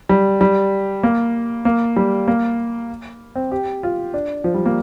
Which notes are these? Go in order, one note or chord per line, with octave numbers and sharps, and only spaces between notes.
G3
G3
A#3
A#3
G3
A#3
C4
G4
F4
D4
F3
G3
A#3